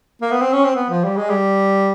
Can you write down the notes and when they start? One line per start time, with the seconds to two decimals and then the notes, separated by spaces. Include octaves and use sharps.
0.22 A#3
0.31 B3
0.41 C4
0.53 C#4
0.64 C4
0.75 B3
0.90 F3
1.04 G3
1.17 G#3
1.29 G3